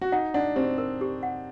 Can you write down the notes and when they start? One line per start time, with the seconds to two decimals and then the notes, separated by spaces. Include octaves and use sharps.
0.02 F#4
0.12 D#4 F#5
0.34 D4 F#5
0.56 C4 G4
0.78 A#4
1.01 G4
1.23 F#5